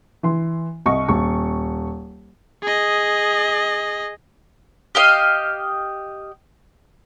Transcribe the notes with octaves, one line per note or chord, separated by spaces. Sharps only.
E3 C6
C2 D#5 C#6
D#1 C#6
G#4 D#5
G4 D#5 F5